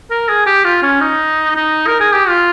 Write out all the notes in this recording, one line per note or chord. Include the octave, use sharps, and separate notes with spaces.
A#4
G#4
G4
F4
C#4
D#4
D#4
A#4
G#4
G4
F4